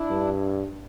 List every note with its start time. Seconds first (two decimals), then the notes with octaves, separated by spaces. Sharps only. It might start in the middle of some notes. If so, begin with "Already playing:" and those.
Already playing: D4 E4
0.10 G2